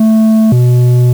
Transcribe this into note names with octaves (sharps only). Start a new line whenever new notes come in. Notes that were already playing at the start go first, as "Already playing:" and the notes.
Already playing: A3
B2